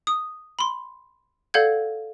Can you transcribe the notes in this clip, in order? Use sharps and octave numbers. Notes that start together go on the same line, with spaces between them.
D#6
B5 C6
A4 D5 F5 F#5 G6 G#6